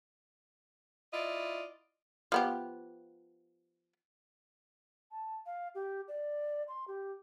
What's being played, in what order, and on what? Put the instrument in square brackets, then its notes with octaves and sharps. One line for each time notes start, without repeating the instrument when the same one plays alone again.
[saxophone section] E4 F4 D5 D#5
[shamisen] F3 B3 G4
[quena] A5
F5
G4
D5
C6
G4